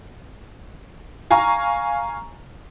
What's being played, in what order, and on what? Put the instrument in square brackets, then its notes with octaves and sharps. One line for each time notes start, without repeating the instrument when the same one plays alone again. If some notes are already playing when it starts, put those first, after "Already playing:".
[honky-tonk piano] F5 G#5 A#5 C#6